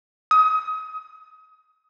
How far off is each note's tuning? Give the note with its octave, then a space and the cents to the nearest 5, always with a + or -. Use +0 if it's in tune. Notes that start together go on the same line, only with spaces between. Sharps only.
D#6 +30